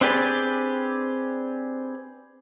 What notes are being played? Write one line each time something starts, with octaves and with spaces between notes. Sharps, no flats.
C4 D4 G4 G#4 B4 D5